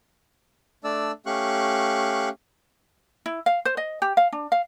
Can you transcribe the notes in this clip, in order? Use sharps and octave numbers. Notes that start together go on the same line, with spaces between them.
A3 D4 D5 E6
A3 C#4 G4 F5 C#6 F#6
E4
F5
C5
D#5
G4
F5
D4
F5